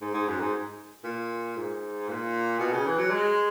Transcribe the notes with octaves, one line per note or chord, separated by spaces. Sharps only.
G#2
G#2
F#2
G#2
A#2
G#2
A#2
B2
C#3
E3
F#3
G#3